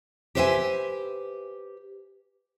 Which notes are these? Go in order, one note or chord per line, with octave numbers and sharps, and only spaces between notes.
G4 B4 C5 D#5 E5 G#5